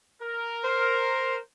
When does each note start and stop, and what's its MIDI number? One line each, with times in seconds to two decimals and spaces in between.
0.22 1.37 70
0.64 1.37 72